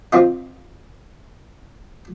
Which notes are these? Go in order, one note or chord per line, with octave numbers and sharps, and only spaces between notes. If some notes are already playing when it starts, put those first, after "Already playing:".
C4 F4 D#5